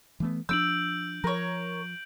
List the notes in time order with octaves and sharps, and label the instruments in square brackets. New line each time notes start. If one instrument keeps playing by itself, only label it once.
[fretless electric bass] E3 A3 B3
[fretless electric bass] F3 C4 D4 [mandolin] E6 [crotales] G6 D7 F#7
[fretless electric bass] F3 [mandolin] A#4 C#5